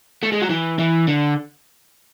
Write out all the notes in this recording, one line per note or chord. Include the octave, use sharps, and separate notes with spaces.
A3
G#3
F#3
E3
E3
D3